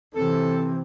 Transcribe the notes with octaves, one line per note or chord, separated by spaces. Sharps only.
C3 E3 C4 A4